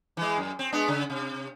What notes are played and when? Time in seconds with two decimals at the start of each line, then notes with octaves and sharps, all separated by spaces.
0.17 E3 G#3
0.38 F#2
0.59 C4
0.72 G#3 B3 D4
0.88 C#3
1.10 C3